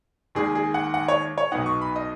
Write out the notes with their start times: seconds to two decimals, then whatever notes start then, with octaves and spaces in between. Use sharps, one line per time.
0.35 D#2 D#3 G#3 G#4
0.55 G#4
0.74 F#5
0.94 F#5
1.08 C#5
1.38 C#5
1.52 B1 B2 B3 D#4 F#5
1.66 C#6
1.81 B5
1.96 D#5